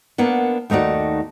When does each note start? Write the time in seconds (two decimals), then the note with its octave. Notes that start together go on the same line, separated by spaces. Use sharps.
0.18 A#3 B3 D4 F#5
0.70 D#2 A3 D#4 F#4 D5